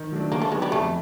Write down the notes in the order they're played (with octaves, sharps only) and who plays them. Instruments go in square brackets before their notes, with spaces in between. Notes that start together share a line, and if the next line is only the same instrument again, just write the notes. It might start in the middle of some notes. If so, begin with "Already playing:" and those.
Already playing: [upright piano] D#3
F#3 A3 D4
[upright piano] D3 [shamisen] A#3
[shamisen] A3
[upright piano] F#3 B3 D#4 [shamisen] G#3
[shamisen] G3
[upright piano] F2 [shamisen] A3